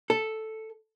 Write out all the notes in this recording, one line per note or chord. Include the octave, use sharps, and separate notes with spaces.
A4